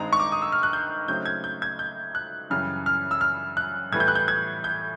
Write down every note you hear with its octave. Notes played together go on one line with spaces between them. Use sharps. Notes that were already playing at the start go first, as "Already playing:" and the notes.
Already playing: G2 D#3 G#3 C4 D#4 A#5
C#6
D6
D#6
E6
F6
F#6
G6
C#3 F#3 A3 C4 D#4 G6
G#6
G6
G#6
G6
F#6
F#2 C#3 E3 G3 F6
F6
E6
F6
F#6
A2 E3 G3 B3 G#6
G6
F#6
G6
G#6
G6